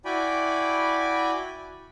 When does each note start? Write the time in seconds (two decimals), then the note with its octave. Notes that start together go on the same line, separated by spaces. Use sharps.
0.05 E4 F#4 D5 G5 G#5 B5